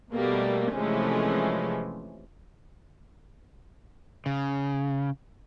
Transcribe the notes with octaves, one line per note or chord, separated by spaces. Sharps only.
B2 G3 A3 A#3
C3 E3 F3 G#3 A3 C#4
C#3